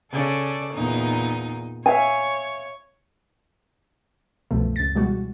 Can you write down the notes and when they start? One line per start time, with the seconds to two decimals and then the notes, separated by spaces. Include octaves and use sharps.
0.12 C#3 A4 D5
0.73 E2 A#2 D#4
1.86 C#5 E5 F5 G#5
4.51 C2 F#2 B2 F3 A3
4.76 C#2 A6
4.95 B2 E3 G3 G#3 F#4